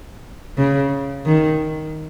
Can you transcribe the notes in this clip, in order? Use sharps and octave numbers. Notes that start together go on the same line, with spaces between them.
C#3
D#3